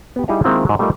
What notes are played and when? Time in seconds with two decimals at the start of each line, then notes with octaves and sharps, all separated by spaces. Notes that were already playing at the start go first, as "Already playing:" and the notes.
0.16 B3 G4
0.28 G3 D#4 E4 G#4 D#5 F5
0.44 D#3 G#3 A#3 C4 E4 F4
0.67 G#2 F#3
0.79 G3 A3 D#4 F4 A#4 D#5